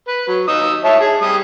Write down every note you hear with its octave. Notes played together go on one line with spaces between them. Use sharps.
B4
F#3
D#4 D#6 E6
C#5 E5 A5
G#4
G3 D#6